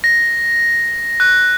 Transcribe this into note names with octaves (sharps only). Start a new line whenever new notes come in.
A#6
F#6